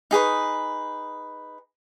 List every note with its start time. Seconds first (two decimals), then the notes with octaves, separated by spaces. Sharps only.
0.11 D#4 G#4 B4 C#6